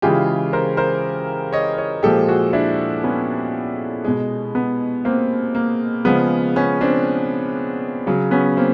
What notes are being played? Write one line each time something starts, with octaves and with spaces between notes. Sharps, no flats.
C#3 E3 G#3 F4 G4
A#4 C5
A#4 C5
C#5 D#5
C#5 D#5
A#2 F3 G#3 G4 A4
F#4 G#4
D4 E4
B3 C#4
B2 G#3
B3
A#3 C4
A#3
C#3 F3 G#3 B3
B3 C#4
C4 D4
C#3 F#3
B3 C#4
A#3 C4